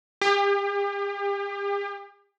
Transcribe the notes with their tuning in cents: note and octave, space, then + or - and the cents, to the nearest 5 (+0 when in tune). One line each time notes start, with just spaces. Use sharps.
G4 +40